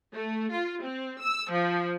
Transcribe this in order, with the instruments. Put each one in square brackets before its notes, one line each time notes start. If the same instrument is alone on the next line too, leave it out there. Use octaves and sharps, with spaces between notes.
[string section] A3
F4
C4
E6
F3